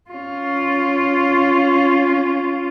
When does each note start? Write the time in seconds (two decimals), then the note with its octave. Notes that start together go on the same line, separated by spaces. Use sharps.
0.10 C#4 F4